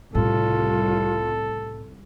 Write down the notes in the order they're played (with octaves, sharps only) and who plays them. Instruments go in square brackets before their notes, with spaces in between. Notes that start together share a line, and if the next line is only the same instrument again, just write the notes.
[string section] C2 [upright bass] A2 C#3 [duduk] F4 [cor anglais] A4